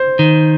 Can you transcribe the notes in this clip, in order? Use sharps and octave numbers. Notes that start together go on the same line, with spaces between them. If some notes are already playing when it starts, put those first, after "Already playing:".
Already playing: C5
D#3